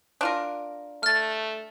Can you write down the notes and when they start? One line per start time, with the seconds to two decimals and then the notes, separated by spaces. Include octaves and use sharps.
0.21 D4 F4 A#4
1.03 A3 F6 A6